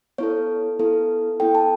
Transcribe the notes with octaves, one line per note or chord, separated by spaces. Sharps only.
B3 E4 A4 C#5
B3 E4 A4
B3 E4 A4 G5
A5